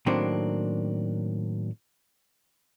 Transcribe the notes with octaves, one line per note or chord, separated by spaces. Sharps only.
A2 D#3 F#3 A#3 C4 D4